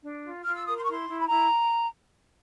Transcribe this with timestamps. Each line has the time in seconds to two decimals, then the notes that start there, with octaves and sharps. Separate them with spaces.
0.02 D4
0.24 F4
0.44 F4 F6
0.55 E6
0.65 A#4 D#6
0.76 C6
0.84 E4 C#6
0.92 C6
1.07 E4
1.20 B5
1.28 E4 A#5